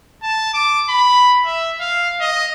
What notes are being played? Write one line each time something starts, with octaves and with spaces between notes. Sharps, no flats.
A5
D6
B5
E5
F5
D#5